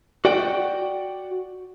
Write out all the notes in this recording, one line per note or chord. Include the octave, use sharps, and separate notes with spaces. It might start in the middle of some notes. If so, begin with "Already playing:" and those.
F#4 D5 F#5 G5